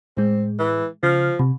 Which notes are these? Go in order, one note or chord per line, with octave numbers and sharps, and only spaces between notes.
A2 G#3 C4
E3
C#3 F3 F6
C3